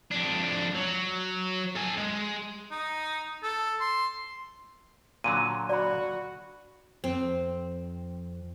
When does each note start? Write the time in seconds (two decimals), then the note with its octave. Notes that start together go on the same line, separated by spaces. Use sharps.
0.12 F2 D4
0.75 F#3
1.76 A4 G#5
1.97 G#3
2.71 D#4
3.43 A4
3.80 C6
5.24 A#2 D3 F#3 D#7
5.69 F#4 D5 B5
7.04 F2 C4